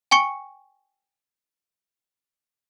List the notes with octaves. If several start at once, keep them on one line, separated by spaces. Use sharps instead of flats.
G5 G#5 C#6 C#7